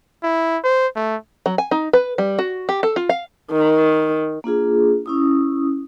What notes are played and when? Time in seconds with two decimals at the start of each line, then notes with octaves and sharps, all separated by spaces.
0.23 E4
0.64 C5
0.96 A3
1.46 F#3
1.58 G#5
1.71 D#4
1.93 B4
2.18 G3
2.39 F#4
2.69 G4
2.83 A4
2.96 F4
3.09 F5
3.52 D#3
4.44 A#3 D4 F4 G#4
5.06 C#4 E4 D#6